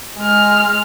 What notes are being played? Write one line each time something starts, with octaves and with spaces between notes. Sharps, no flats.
G#3 F6